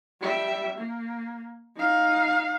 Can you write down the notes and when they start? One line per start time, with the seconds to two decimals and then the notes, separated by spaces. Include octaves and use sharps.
0.21 G3 E5
0.78 A#3
1.76 D#4 F5